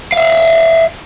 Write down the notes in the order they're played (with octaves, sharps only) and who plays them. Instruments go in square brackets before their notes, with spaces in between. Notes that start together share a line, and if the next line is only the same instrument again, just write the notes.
[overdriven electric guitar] E5 F5